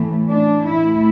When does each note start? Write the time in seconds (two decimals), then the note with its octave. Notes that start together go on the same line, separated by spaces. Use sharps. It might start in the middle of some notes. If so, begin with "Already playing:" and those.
Already playing: A2 E3 A3
0.28 D4
0.67 A2 E3 A3 E4